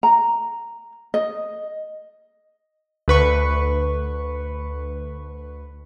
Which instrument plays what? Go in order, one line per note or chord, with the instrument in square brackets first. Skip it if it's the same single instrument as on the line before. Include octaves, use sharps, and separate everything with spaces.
[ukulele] A#5
D#5
[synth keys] D2 B4 C#6